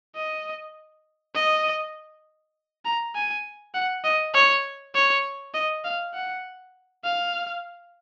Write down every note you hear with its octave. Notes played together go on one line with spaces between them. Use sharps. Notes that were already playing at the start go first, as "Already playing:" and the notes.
D#5
D#5
A#5
G#5
F#5
D#5
C#5
C#5
D#5
F5
F#5
F5